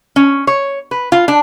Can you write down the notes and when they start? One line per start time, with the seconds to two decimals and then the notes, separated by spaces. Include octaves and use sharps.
0.16 C#4
0.47 C#5
0.91 B4
1.12 F4
1.28 D4